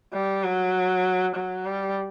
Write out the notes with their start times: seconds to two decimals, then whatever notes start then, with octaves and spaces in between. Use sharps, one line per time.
0.13 G3
0.43 F#3
1.35 F#3
1.65 G3